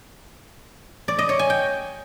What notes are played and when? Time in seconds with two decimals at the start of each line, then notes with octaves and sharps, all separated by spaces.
1.08 D5
1.19 D#5
1.29 C#5
1.39 G#5
1.50 G5